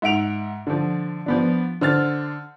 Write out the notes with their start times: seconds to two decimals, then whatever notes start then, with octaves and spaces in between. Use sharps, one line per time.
0.02 G#2 E5 F#5 D7 F7
0.67 D3 F3
1.26 F3 B3 D4
1.81 D3 C5 F6 A6